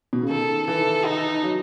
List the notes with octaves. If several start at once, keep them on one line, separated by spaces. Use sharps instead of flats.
B2
C#3
D#3 A4
E3 A4
D#4
F#3